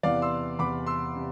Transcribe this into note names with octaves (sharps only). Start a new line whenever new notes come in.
E2 C3 E3 B3 D5 F5
C6 E6
E2 C3 E3 B3 B5 D6
C6 E6
C3